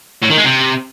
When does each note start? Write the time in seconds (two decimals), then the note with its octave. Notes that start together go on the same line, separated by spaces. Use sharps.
0.22 A2
0.30 D#3
0.37 G#3
0.44 C3